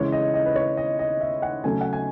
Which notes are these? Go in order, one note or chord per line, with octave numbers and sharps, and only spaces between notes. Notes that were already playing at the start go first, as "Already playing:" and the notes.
Already playing: C#3 E3 G#3 C#5
D#5
D#5
B4
C#5
D#5
D#5
E5
F#5
C#3 F#3 A3 G#5
F#5
G#5